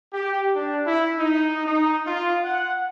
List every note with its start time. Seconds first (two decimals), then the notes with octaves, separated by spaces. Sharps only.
0.14 G4
0.56 D4
0.87 E4
1.20 D#4
1.67 D#4
2.07 F4
2.45 F#5